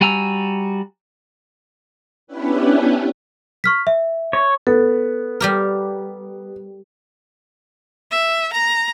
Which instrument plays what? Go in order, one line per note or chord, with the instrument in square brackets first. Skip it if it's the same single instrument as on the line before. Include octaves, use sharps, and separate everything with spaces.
[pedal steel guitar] G3 F#4 G#5 A#5 E6
[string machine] B3 C#4 D4 E4 G4 B4
[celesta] C#6 F6 B6
E5
[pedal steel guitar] C#5
[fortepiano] B3 [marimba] A4
[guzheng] G3 G4 A#4
[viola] E5
A#5